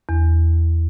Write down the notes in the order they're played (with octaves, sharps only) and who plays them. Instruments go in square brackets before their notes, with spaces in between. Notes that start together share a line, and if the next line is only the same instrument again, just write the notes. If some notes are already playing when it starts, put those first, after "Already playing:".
[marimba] E2